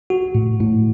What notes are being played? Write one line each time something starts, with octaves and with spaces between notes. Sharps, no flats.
F#4
A2
A2